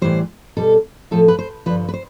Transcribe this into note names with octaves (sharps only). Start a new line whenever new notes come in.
A2 E3 G3 C5
B2 G3 A4
A2 F3 A4
B4
C5
G2 D3 F3 B4
B4
C5